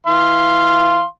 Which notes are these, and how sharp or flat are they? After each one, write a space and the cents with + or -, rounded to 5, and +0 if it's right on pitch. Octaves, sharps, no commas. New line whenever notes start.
E3 -10 F5 -15 C6 +0